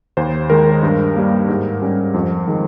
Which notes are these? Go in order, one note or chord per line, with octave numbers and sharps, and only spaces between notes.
D#2 C5
D#3 G#3 D#4 A#4
G2
G3 A#3
G#2
G3 C#4
F2
D#3 G#3